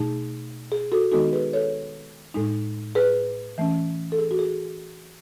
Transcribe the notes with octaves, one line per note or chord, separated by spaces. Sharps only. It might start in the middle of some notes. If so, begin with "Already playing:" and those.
Already playing: B2 A3 D#4 G#4
G#4
F#4 A4
D#3 G#3 B3 D#4 F#4 A4
G#4 B4
A4 C#5
A2 G#3 D#4
G#4 B4
E3 A3 C#4
A4
G#4
F#4
G#4